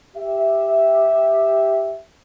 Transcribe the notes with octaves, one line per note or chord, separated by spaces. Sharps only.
G4 E5